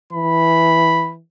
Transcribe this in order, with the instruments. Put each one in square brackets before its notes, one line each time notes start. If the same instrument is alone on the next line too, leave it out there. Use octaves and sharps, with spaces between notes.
[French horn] E3 [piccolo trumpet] B5